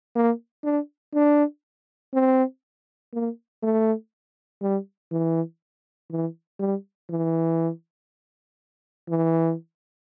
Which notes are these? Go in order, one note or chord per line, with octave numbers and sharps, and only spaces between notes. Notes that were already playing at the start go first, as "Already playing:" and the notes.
A#3
D4
D4
C4
A#3
A3
G3
E3
E3
G3
E3
E3